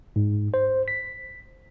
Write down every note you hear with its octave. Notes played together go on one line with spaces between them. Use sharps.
G#2
C5
B6